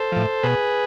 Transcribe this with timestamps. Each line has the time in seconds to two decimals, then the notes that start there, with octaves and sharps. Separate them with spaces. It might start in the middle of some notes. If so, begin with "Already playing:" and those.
Already playing: A4 C5
0.12 A2 F3
0.43 B2 G#4 B4